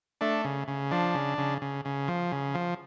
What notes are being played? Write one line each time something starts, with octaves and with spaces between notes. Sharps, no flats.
A3 D4
C#3
C#3
F3 D4
C#3
C#3
C#3
C#3
F3
C#3
F3